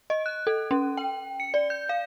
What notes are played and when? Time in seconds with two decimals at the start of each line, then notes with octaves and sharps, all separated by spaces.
0.10 D#5
0.26 F#6
0.47 A4
0.71 C#4
0.97 G5
1.40 C#7
1.54 D5
1.70 G6
1.89 F5